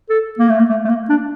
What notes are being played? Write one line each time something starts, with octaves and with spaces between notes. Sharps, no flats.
A4
A#3
A3
A#3
A3
A3
A#3
D4